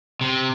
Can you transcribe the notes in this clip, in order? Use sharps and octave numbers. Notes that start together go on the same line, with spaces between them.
C3